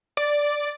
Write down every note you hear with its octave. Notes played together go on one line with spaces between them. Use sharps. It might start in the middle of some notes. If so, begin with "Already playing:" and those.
D5